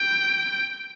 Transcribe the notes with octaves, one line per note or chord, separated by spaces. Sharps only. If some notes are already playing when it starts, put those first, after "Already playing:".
Already playing: G5